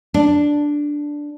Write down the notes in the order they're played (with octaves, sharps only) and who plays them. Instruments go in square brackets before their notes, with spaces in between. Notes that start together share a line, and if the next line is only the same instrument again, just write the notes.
[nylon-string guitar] D4